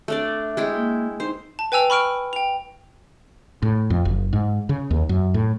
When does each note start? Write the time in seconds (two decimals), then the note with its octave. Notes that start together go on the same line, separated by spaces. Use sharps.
0.08 A3 D4 D5
0.43 E5
0.57 G#3 E4 G5
0.75 A#3
1.20 D#4 C5
1.59 A5
1.72 B4 G5 G#5 E6 F7
1.90 B5 C#6 F6 D7
2.33 G5 F7
3.62 A2
3.90 F2
4.05 F#1
4.33 G#2
4.69 C#3
4.91 D#2
5.09 F#2
5.34 A2